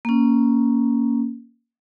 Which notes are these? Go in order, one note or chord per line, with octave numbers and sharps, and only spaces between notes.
A#3 C#4